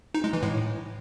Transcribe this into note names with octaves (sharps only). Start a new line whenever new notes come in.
D#4
G#3
E3
A2